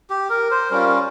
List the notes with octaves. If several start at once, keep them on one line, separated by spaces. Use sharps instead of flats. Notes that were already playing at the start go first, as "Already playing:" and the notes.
G4
A#4
C5
G3 C#4 F4 A#4